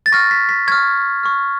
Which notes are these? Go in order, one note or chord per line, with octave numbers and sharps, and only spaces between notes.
A6
C#6 F6 A#6
B6
B6
C#6 F6 G#6
C#6 F6